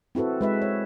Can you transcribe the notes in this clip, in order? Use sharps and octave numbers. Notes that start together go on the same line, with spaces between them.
C4 E4 F#4 A4 B4
G#3 B4 E5
C#5